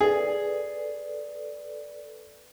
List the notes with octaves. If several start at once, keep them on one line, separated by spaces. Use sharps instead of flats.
G#4 A4 B4 D5